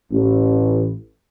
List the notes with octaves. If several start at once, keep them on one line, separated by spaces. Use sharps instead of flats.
A1